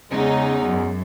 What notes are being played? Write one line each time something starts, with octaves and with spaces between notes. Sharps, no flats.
E2 C#3 G#3 D#4
F#2